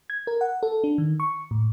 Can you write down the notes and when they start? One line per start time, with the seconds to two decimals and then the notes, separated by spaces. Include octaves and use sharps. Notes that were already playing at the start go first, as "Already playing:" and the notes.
0.10 G#6
0.27 A#4
0.41 F#5
0.63 A4
0.84 D4
0.98 D#3
1.20 C#6
1.51 A2